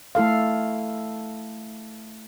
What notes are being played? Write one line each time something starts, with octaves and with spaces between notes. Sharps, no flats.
A3 E4 A4 F5